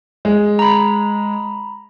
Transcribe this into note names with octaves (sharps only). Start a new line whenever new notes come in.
G#3
A#5 B5